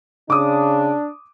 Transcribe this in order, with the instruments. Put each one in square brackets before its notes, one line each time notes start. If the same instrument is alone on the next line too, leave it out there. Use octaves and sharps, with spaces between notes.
[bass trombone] C#3 [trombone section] D4 [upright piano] D6 D#6